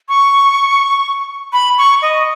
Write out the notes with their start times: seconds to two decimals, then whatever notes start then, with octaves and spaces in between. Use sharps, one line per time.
0.09 C#6
1.53 B5
1.78 C#6
2.02 D#5